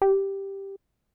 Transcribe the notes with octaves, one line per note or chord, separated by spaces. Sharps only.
G4